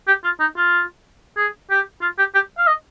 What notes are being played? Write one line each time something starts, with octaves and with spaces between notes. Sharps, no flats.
G4
F4
D#4
F4
G#4
G4
F4
G4
G4
F5
D#5